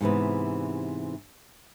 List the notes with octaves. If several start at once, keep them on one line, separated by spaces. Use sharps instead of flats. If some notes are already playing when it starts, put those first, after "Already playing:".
G#2 C3 E3 B3